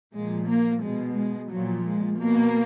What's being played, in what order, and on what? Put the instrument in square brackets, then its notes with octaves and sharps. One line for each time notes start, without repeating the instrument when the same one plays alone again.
[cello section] A#2 F3 G#3
A#3
B2 G#3
G#3
A#2 F3 F#3
G#3
B2 A#3